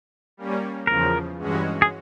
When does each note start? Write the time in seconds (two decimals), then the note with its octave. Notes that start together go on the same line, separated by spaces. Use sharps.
0.37 G3 A#3 C#4
0.87 E2 C#3 F3 A#4
1.38 G2 E3 G#3 C#4 F#4
1.82 G#4